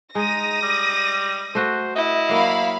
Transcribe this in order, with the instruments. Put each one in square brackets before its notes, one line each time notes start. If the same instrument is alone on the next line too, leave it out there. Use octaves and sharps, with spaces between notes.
[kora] G#3 [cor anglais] D#4 [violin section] D#6 A#6
[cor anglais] G3
[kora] A3 F#4 [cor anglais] C5
[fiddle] E4 [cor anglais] D#5
[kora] F#3 A#3 [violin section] F5 B5